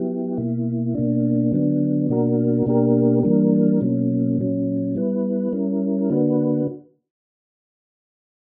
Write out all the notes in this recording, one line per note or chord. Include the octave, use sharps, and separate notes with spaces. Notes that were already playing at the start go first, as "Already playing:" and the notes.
Already playing: F#3 B3 E4 G4
B2 A#3 E4
B2 A#3 D4
D3 F#3 B3 D4
B2 A#3 D4 F#4 A#4
B2 A#3 D4 G4 A#4
E3 G3 A#3 D4 A#4
B2 F#3 A#3 C#4
A#2 F#3 C#4
G3 B3 E4 B4
G3 C#4 E4 A#4
D3 A#3 D4 F#4 B4